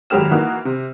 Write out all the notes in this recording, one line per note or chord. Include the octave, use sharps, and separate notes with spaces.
G#1 F#3 G#3 G4 F6 E7
E3 A#3 D#4 F#4
C3